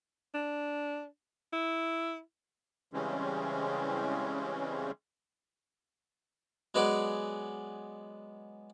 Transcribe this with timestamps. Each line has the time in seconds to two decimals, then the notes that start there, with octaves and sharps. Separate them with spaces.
0.34 D4
1.53 E4
2.93 C#3 E3 G3 G#3 C4 C#4
6.74 F#3 G#3 B3 B4 D5